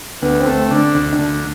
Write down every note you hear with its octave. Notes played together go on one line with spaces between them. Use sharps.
D2 B3
C4
A3
C4
D3
D4
D2
D4
D2